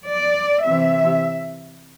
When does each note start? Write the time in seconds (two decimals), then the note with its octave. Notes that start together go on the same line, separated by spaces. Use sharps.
0.08 D5
0.65 C3 E3 E5